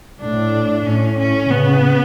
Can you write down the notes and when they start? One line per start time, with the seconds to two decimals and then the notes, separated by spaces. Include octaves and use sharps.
0.21 A2 D4
0.86 A2 C#4
1.18 C#4
1.51 C#3 B3